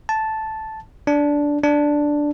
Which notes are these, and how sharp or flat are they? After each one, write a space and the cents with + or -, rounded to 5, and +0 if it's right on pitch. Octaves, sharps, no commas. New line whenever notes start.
A5 -5
D4 -10
D4 +0